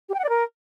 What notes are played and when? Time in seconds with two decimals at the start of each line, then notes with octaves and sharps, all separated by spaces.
0.09 G4
0.14 G5
0.19 F#5
0.24 D5
0.29 A#4